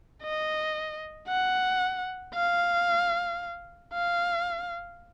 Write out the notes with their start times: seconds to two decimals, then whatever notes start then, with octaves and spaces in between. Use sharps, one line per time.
0.23 D#5
1.28 F#5
2.35 F5
3.94 F5